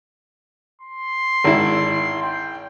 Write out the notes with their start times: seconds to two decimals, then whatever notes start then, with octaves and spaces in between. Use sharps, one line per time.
0.81 C6
1.44 G#1 E4
2.22 G5